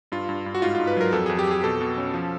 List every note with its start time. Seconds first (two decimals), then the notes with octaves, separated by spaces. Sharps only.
0.12 G2 F4
0.29 G2
0.46 G2
0.55 F#4
0.62 G#2 F4
0.75 G#2 F4
0.87 B4
0.97 F#3 A#4
1.13 F2 A4
1.26 F2 G#4
1.39 G4
1.47 F2 G#4
1.63 B2 A4
1.81 B2
1.97 C#4
2.14 F3